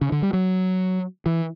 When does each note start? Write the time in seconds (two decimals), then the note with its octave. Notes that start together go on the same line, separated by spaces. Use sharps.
0.01 C#3
0.12 D3
0.22 G3
0.33 F#3
1.26 E3